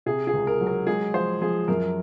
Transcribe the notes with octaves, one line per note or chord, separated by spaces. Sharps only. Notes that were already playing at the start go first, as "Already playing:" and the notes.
C3 G#4
G#4
C#2
A#4
F#3
A#4
G#3 G#4
F3 C5
F3 G#4
F#2 A#4